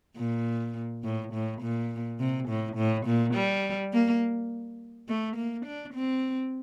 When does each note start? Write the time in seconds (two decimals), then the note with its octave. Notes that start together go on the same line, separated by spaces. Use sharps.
0.17 A#2
1.04 A2
1.33 A2
1.62 A#2
2.19 C3
2.48 A2
2.77 A2
3.06 A#2
3.34 G3
3.93 A#3
5.09 A3
5.36 A#3
5.66 D4
5.94 C4